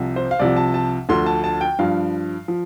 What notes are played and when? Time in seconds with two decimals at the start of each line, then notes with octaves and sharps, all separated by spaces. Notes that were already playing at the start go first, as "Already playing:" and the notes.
Already playing: C2 C3 F3
0.16 C5
0.31 F5
0.39 C2 C3 F3 D5
0.57 A5
0.74 A5
1.09 D2 D3 F3 C6
1.26 A5
1.44 A5
1.61 G5
1.79 G2 F3 F5
2.48 F3